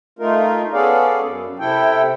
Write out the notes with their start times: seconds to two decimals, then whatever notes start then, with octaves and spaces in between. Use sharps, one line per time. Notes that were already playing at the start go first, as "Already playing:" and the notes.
0.19 A3 D#4 F4 A#4
0.73 B3 C#4 G#4 A4 D5 F5
1.22 F#2
1.59 C3 E4 A4 G5